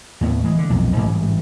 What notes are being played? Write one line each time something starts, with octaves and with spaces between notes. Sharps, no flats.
D#2 A2 A#3 B3
E3 G#3
D3
B1 F2 A#2
A1 G#2 E3 G3